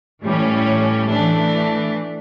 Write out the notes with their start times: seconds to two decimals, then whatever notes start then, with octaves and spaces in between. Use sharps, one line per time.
0.22 A2 E3 G3 C#4
1.08 E3 A3 D4